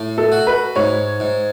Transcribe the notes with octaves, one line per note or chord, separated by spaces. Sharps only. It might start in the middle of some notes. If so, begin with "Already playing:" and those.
Already playing: A2
A4
F#4
B4
G#2 C#5
G#2